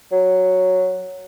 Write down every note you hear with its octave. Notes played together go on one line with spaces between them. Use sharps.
F#3